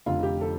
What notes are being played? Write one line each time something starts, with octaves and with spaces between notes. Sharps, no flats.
F1 F2 D3 F4
G4
A4